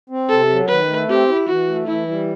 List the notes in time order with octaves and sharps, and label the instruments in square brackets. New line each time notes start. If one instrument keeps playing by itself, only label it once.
[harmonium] C4
[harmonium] C3 [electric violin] A4
[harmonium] F#3
[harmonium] D#3 [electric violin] B4
[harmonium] A3
[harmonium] C4 [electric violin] G4
[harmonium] E4
[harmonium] E3 [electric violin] F#4
[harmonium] A3
[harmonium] E3 [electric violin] E4
[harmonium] G3